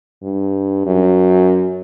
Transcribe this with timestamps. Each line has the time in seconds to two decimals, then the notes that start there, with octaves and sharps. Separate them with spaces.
0.23 G2
0.86 F#2